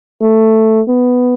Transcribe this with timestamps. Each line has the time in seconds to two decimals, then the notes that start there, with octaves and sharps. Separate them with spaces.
0.21 A3
0.88 B3